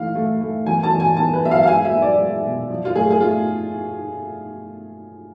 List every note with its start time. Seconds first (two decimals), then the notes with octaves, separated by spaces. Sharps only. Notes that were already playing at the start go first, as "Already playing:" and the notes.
Already playing: E3 A3 F5
0.15 A3
0.41 A3
0.66 E2 G#5
0.83 A5
0.92 E2
1.00 G#5
1.17 B3 A5
1.34 B4
1.43 B3 E5
1.51 F5
1.63 F5
1.67 G#3 G#5
1.85 E5
1.93 B3
2.02 D5
2.19 G#3
2.45 B2
2.70 F3
2.85 F4
2.95 A3 G#4
3.10 G#4
3.21 A3 F4